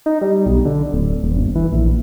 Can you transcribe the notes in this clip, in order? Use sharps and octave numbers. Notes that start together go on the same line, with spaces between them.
D#4
G3
B1
D3
D1
D#1
G1
E3
A#1